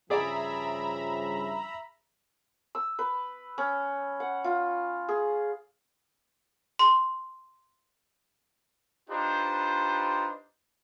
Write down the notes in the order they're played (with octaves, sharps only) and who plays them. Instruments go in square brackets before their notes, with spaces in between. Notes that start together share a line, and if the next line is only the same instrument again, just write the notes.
[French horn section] G2 C#3 F3 [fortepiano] G#4 D5 [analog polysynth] E5 A#5 B5
[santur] E6
B4
C#4
F#5
F4
G#4
[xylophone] C6
[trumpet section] D4 D#4 F4 G4 B4 C5